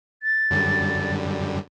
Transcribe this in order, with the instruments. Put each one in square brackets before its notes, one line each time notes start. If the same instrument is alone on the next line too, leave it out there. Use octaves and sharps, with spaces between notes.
[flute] A6
[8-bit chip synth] F#2 D3 G3